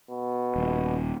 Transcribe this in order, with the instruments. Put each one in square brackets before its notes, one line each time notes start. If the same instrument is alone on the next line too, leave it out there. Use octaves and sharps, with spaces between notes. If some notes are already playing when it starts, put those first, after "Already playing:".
[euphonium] B2
[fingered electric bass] D#1